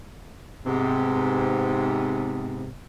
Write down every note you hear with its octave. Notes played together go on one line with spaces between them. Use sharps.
G#2 C3 B3